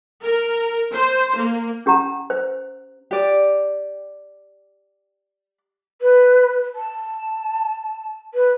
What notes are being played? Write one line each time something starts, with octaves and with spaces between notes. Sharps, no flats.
A#4
C5
A#3
C#4 G4 F#5 A#5
C5
G4 D5
B4
A5
B4